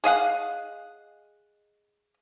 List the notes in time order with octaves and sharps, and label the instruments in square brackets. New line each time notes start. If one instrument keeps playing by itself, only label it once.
[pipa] G#4 D#5 F5 F#5